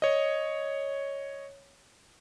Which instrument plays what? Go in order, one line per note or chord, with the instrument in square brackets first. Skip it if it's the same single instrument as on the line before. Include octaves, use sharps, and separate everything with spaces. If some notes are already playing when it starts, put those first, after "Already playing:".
[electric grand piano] C#5 D#5